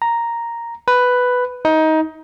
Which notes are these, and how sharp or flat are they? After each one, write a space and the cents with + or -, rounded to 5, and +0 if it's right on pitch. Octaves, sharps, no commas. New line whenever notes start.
A#5 +0
B4 +5
D#4 +20